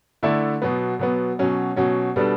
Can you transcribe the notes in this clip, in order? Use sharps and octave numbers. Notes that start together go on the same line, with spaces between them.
D3 A3 E4 A4 D5
B2 F#3 B3
B2 F#3 B3
B2 F#3 C#4
B2 F#3 C#4
B2 G3 B3 D4 A4